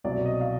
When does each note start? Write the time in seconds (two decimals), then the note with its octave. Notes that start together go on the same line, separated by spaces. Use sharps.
0.04 C2 B2 F#3 D5
0.26 D#5
0.41 F5